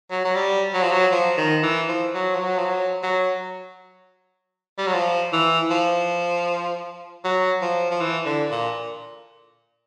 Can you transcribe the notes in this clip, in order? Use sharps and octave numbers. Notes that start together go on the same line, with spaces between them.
F#3
F#3
G3
F#3
F3
F#3
F3
D#3
E3
F3
F#3
F3
F#3
F3
F#3
F#3
G3
F#3
F3
E3
F3
F#3
F3
F3
E3
D3
A#2